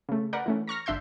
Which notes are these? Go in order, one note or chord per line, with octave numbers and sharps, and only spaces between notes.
C#3 A3
A#4 B4 D5 F#5
E3 A3 C#4
A#5 C#6 F6 A#6
G1 D4 E5 C6 G6